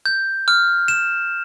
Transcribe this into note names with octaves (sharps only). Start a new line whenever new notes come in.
G6
F6
E7